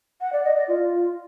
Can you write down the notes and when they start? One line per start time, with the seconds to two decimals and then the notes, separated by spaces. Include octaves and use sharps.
0.21 F#5
0.33 D5
0.44 D#5
0.56 D5
0.68 F4